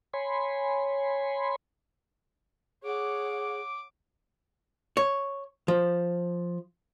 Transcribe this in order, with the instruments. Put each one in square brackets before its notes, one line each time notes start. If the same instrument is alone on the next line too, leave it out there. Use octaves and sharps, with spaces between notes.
[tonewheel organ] C#5 G#5 B5 C6
[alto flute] G#4 [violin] C#5 F#5 [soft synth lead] D6
[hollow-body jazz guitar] C#5
F3